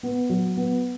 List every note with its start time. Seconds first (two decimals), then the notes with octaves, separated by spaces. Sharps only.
0.03 B3
0.30 F#3
0.57 B3